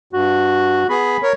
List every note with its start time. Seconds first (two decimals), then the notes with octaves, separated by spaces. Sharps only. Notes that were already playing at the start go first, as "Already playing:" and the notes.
0.13 G2 F#4
0.89 B3 G#4 B5
1.23 A#4 C#5